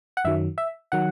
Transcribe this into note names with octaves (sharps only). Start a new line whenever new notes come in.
F#5
F#2 D#3 F#3 E5
E5
D#3 F#3 F#5